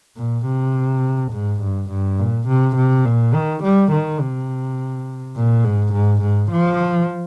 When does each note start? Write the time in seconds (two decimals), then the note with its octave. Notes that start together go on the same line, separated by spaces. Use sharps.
0.16 A#2
0.46 C3
1.32 G#2
1.61 G2
1.89 G2
2.19 A#2
2.48 C3
2.76 C3
3.05 A#2
3.34 D#3
3.63 G3
3.92 D#3
4.20 C3
5.35 A#2
5.64 G#2
5.93 G#2
6.22 G#2
6.51 F3